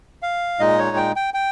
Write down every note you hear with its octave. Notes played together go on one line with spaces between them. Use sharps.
F5
A#2 G#3 D#4 D#5
C#5
G5
G5
G5